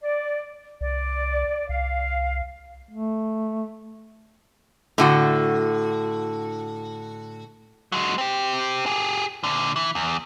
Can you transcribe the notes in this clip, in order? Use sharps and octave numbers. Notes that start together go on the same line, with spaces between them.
D5
C2 D5
C2 F5
A3
A2 D3 F#4
F#3 G#3
C4 G4
G4 G#4
A#2 D3
E3
E2